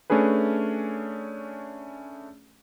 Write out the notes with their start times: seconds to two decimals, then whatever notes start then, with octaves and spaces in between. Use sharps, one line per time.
0.10 A3 C#4 D4 G#4 B4